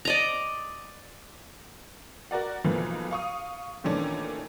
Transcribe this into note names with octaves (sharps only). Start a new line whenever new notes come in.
D5 D#5 A#5
F#4 A#4 D5 F#5
B1 E3 F3 A3 A#3
F5 C#6 D#6
A#2 D#3 E3 A3 C#4 D4